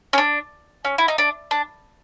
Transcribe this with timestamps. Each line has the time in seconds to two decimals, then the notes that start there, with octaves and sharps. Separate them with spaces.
0.13 C#4
0.18 D4
0.85 C#4
0.98 E4
1.08 D#4
1.18 D4
1.51 D4